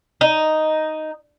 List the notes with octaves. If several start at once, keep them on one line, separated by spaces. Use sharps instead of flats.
D#4